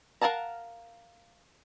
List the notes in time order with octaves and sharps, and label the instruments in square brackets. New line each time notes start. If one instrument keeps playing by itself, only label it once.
[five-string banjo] A#4 F5 F#5 A5 A#5